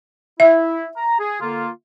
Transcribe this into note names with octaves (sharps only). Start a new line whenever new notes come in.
E4 E5
A#5
G#4
D3 A#3 F4